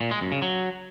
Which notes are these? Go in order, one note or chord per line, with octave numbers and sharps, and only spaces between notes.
A#2
G#3
F#2
C#3
F#3